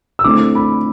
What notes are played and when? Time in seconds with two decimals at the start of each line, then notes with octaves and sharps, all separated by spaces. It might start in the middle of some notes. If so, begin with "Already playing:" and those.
0.19 E6
0.24 D3 A3 C4 E4 D6
0.55 B5